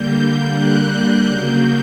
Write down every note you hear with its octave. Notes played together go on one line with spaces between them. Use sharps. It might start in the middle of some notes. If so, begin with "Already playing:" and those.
Already playing: D3 G3 A#3 G6
F#6
C#3 F#3 A#3 G6